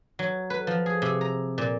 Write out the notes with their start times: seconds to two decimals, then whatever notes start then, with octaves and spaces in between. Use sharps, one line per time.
0.19 F#3
0.50 B4
0.67 F3
0.86 G#4
1.02 C3
1.21 A#5
1.58 A#2